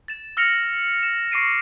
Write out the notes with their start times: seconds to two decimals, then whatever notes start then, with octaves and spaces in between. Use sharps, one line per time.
0.08 A6 E7
0.37 E6 F6 A#6 C#7 F7
1.03 E7
1.32 C#6 D6 A#6 C7 D7 D#7